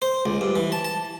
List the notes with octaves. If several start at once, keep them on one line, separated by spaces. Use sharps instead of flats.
C5
C#2
G2
E3
A5
A5